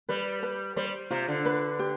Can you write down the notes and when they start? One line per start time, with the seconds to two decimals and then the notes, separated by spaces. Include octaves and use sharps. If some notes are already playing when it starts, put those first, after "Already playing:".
0.09 G3 B4
0.43 B4
0.76 G3 C5
1.10 C3 F4
1.28 D3
1.45 B4
1.79 G4